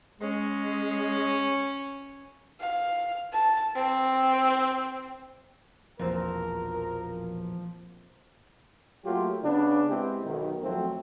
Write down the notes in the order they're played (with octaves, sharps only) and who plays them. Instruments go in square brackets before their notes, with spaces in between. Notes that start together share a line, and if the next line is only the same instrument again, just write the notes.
[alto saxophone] G#3 [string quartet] C#4
[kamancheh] F5
A5
C4
[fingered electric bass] E1 A#1 E2 [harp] A#2 C4 [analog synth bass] F3 [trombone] A#4
[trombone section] F#3 A3 A#3 F4 G4
C#3 B3 D4
G#3 B3 C4 E4 G4
B1 D#3
F2 F#3 A3 C4